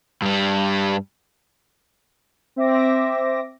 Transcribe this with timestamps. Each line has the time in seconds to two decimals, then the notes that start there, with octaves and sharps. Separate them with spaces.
0.22 G2 G3
2.56 C4 E5 D6 A#6